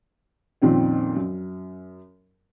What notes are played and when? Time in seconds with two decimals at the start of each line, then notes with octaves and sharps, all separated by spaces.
0.62 F2 A#2 D#3 C4 C#4
1.17 F#2